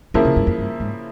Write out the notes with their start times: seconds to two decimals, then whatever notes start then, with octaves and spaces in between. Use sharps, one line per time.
0.14 C#3 E3 F3 A#3 E4 A#4
0.25 C3
0.36 G2
0.47 F2
0.58 G2
0.80 G#2